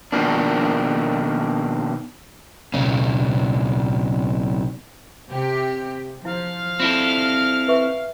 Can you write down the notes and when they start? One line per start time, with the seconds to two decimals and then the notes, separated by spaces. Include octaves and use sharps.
0.12 B2 D#3 F3 A#3 D4
2.74 B1 C#3
5.30 C3 G4
6.25 F3 E4 F5
6.80 C4 E4 F4 A4 F6
7.68 B4 E5 C#6